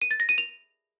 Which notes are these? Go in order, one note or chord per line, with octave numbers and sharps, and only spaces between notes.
D#7
A6
A#6
D#7
F7